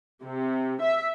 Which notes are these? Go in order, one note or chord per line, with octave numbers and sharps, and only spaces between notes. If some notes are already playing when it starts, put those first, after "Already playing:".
C3
E5